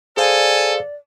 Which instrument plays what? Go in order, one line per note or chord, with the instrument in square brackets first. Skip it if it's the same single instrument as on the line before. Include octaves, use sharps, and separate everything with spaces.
[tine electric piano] G#4 C5 F5 [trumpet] A4 [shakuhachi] D5 [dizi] G#5